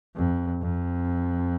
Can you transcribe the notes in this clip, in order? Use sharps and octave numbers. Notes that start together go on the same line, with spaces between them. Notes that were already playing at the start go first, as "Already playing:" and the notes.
F2
F2